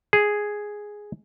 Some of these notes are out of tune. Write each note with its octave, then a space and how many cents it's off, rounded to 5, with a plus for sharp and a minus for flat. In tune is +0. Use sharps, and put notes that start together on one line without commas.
G#4 +0